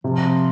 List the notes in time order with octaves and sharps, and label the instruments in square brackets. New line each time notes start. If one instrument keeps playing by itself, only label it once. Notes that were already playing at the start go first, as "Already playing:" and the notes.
[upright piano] C3 [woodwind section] F3